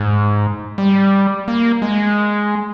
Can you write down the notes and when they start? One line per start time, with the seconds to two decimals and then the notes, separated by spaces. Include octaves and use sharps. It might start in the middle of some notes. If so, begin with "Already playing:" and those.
Already playing: G#2
0.78 G3
1.48 A#3
1.82 G#3